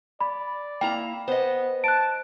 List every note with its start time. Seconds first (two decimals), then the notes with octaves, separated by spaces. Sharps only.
0.20 D5 B5
0.81 A#3 E4 G5 A#5
1.28 B3 C5 D#5
1.84 A5 F#6 D7